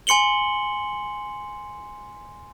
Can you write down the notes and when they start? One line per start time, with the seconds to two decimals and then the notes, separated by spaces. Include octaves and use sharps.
0.07 G#5 C6 C#7 F#7 G7